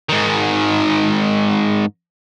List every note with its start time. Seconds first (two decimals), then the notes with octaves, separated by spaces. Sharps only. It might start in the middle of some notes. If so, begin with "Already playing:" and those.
0.09 G#2 D#3